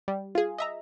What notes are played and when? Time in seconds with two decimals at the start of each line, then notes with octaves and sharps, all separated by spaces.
0.08 G3
0.35 F4 G#4
0.58 D#5 E5 A#5